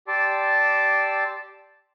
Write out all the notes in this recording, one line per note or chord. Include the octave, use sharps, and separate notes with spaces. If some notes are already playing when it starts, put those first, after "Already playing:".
G4 D5 A5 C6 D6 E6